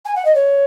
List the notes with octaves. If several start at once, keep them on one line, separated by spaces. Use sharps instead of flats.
G#5
F#5
D#5
C#5